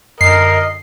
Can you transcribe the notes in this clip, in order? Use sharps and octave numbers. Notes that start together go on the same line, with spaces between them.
F#2 D3 A#4 D#5 C7